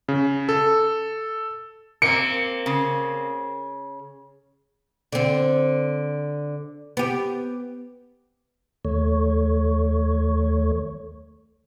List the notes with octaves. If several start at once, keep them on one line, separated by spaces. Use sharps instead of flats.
C#3
A4
A#3 C4 C#7
C#3
D3 C4
B3 G4
D#2 A3 C#5